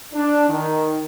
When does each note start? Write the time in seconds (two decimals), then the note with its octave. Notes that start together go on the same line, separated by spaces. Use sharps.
0.13 D4
0.49 D#3